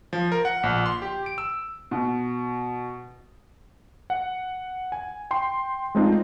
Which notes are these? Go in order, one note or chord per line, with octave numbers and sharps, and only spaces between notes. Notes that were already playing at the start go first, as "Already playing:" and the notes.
F3
A#4
F#5
A#1
C6
G4
D7
E6
B2
F#5
G#5
G5 C6
G#3 A3 C4 D4 D#4 F4